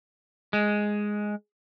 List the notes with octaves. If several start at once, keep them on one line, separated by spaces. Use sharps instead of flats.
G#3